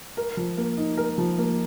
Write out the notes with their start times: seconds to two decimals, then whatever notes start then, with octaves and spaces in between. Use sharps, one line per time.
0.17 A#4
0.37 F3
0.57 A#3
0.78 D#4
0.97 A#4
1.18 F3
1.38 A#3